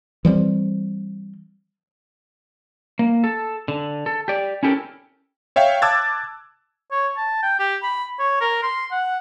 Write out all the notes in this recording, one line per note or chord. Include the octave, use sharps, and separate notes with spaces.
E3 G3 G#3 C4
A#3
A4
D3
A4
G4 D5
C#4 E4 G4 A4 A#4
C#5 E5 F5 G5
A5 D6 E6 F#6 G#6 A6
C#5
A5
G5
G4
B5
C#5
A#4
C6
F#5